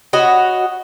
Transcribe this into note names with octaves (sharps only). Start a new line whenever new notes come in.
F#4 B4 C#5 D#5